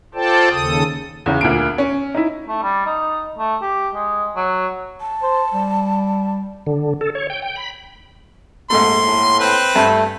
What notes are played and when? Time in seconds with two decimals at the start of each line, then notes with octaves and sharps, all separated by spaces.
0.15 F4 A4 C5 D5 G5 A5
0.50 D#2 C#3 A4 D#6
1.26 E2 C#3
1.41 D2 A#2 D7
1.78 C#4
2.15 D#4 E4
2.48 A3
2.62 G3
2.86 D#4
3.38 A3
3.62 G4
3.94 G#3
4.36 F#3
5.00 A5
5.23 C5
5.53 G3
6.67 D3
7.01 A4
7.15 C#5
7.30 G5
7.42 G5
7.56 B5
8.70 A#1 G#2 A3 C6
9.05 A2
9.40 C4 B4
9.76 G2 A3